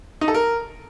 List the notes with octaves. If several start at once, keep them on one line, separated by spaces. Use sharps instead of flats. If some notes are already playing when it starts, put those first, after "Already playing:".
D#4
A4
A#4